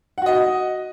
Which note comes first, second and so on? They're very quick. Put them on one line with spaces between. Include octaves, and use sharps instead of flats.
F#5 F#4 D#5